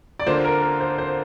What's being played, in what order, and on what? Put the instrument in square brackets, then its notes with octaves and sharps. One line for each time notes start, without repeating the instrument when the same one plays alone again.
[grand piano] D5
[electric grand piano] D3 A#3 F4 [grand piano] C5
[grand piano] A#4
A#4
C5
C5